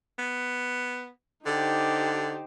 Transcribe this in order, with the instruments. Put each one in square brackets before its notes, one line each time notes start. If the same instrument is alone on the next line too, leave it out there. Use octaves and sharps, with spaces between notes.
[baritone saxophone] B3
[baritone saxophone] D3 [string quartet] D#4 G4 C5